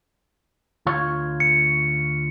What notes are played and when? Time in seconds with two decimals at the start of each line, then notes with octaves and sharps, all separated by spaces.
0.86 D2 F4 C#5
1.40 C#7